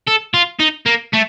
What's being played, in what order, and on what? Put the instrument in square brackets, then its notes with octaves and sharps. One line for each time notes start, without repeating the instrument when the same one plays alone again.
[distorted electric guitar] A4
F4
D#4
A#3
A3